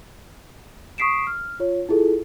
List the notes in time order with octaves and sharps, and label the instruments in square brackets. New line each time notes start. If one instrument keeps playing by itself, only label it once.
[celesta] C#6 D#6 B6 C7 D7 E7
F6
F4 C#5
E4 F4 G#4 A4